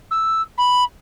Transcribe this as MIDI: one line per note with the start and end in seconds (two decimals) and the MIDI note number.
0.11 0.42 88
0.58 0.84 83